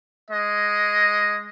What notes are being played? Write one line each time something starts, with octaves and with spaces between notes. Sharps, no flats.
G#3 D#5